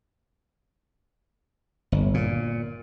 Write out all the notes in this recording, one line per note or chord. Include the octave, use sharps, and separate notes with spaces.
G1
A#2